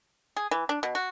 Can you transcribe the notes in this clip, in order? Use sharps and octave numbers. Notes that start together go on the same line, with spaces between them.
G#4
E3
D4
B2
F#4